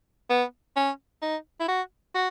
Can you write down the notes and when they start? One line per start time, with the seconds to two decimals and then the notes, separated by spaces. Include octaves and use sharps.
0.30 B3
0.76 C#4
1.22 D#4
1.60 E4
1.68 F#4
2.15 F#4